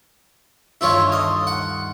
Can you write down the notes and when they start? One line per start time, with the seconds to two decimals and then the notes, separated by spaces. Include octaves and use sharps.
0.81 D2 G2 D#3 E4 F4 C#5
1.12 D#5 A5 C6 F6
1.47 F#5